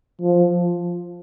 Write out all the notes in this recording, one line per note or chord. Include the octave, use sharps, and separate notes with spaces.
F3